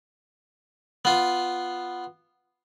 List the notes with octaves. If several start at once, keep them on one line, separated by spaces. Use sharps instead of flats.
B3 F4